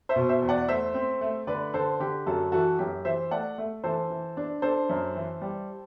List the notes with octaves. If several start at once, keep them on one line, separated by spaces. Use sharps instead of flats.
C5 E5
B2
C5 E5
E2
D5 F#5
A3 C5 E5
C4
A3
D3 B4 D5
D3 A4 C5
D3 G4
F#2 F#4 A4
E3 F#4 A4
F#2 G4
E3 C5 E5
A3 D5 F#5
A3
E3 A4 C5
E3
D4
D4 A4 C5
F#2
E3
G3